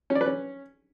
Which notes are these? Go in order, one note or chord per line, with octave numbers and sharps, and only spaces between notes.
C#4
D5
B4
C#4